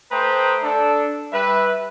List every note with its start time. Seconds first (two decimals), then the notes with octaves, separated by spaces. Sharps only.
0.12 A3 B4 C5 G5 A#5 D#6
0.63 D4 A4
1.33 G3 B4 E5